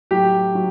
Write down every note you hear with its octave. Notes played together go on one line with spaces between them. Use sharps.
A2 F#3 G4
F#3